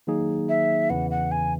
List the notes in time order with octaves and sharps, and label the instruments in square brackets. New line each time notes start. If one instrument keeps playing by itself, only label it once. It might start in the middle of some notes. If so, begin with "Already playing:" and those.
[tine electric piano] D#3 F#3 A#3 D#4 G#4
[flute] E5
[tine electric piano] E2 C#3 E3 [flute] F#5
[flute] F#5
G#5